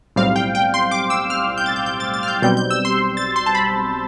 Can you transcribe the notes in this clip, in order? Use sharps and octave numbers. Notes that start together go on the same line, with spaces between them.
B1 A2 G3 C4 F5
G5
G5
C6
D6
E6
F6
G6
A6
G6
G6
A6
A6
F6
G6
B1 B2 G3 C4 G6
G6
E6
C6
A6
C6
A5
B5